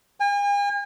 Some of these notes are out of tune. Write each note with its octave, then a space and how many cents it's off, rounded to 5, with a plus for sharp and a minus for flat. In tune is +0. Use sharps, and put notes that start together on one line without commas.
G#5 -45